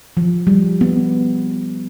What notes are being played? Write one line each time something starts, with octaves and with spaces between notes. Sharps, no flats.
F3
G3
B3